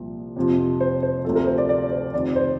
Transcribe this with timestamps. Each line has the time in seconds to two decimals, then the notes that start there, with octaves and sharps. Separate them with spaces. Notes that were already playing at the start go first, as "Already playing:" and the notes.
Already playing: C2 A#2 F3
0.36 F2 C3 F3
0.81 C5
1.03 C5
1.25 D2 C3 F3 A4
1.36 A#4
1.47 C5
1.58 D5
1.69 D5
1.92 C5
2.14 F2 C3 D#3 D5
2.36 C5